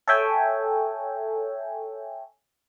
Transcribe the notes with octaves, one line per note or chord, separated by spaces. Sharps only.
A4 C#5 E5 G5 G#5